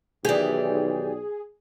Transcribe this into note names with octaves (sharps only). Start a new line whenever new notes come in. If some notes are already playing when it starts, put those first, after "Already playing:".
B1 D#3 E3 G4 G#4 D5